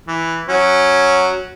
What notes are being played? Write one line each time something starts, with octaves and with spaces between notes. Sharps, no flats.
E3
F#3 C#4